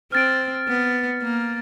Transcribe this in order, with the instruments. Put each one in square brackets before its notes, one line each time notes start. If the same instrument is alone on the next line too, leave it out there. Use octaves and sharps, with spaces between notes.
[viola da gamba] C4 [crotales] F6 A6 D7
[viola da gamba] B3
A#3